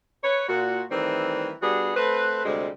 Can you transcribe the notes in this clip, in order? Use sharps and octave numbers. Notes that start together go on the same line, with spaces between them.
B4 C#5
A#2 F#4
D#3 E3 G3 A3 C4
G3 B3 D4 F#4 G#4
A3 C4 B4
D2 C3 G3 G#3